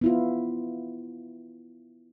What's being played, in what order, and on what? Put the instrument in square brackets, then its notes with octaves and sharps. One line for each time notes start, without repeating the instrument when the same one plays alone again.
[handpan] B3 E4 F4